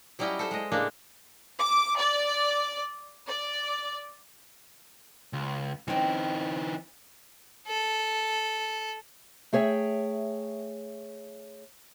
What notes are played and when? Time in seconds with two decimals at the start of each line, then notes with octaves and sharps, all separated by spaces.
0.19 F#3 G3 C#4 E4 D#5 G5
0.39 A4 C5
0.51 G#3 D#5
0.72 A2 C#3 G#3 A#3 D4
1.59 D6
1.98 D5
3.28 D5
5.33 C#2
5.88 E3 C4 C#4 D#4
7.67 A4
9.53 A3 G#4 C#5 E5 G5